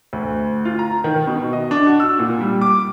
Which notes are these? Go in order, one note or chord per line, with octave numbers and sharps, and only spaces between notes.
D2
F4
A#5
D#3
B2
D#5
D4
F#4
E6
A#2
G3
D6